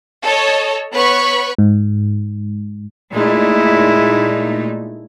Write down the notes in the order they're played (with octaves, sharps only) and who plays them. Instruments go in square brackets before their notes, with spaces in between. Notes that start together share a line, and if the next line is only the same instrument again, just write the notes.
[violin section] A4 C#5 D#5
B3 B4 C#5 B5 C#6
[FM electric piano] G#2
[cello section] A#2 A3 D#4 [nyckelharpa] G#3 E4